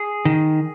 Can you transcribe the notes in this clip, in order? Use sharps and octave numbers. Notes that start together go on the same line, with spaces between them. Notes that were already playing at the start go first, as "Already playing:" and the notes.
Already playing: G#4
D#3